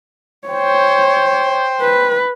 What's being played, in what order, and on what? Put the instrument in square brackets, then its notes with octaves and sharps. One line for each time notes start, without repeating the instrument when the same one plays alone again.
[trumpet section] C5 G5 [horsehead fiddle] C#5
[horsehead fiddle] B4